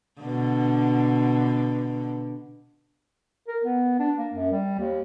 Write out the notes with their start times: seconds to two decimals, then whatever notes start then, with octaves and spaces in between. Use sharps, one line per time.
0.21 B2 D3
3.48 A#4
3.64 B3
3.99 D4
4.18 A#3
4.34 F#2
4.51 G3
4.79 D#2